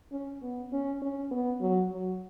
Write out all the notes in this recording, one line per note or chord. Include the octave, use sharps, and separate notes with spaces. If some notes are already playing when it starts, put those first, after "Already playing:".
C#4
B3
C#4
C#4
B3
F#3
F#3